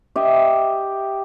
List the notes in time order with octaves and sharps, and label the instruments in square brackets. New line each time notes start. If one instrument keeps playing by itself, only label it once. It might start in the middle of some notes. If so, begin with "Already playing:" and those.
[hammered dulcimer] G4 D#5 E5